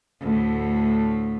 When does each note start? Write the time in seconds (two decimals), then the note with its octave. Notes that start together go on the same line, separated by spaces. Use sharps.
0.21 D2 A2